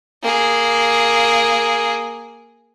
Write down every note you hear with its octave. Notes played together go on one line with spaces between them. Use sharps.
A#3 G#4